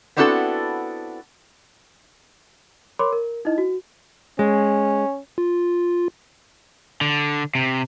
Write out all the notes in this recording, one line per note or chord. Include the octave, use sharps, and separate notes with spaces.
B3 C4 D4 E4 F#4 A4
A#4 C#5 B5 C6 D6
A#4
D#4 E4 D#5
F#4
G#3 C#4
F4
D3
C3